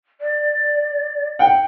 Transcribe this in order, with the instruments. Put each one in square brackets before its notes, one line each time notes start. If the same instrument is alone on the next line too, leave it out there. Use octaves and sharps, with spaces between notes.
[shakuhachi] D5
[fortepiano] F#5 G5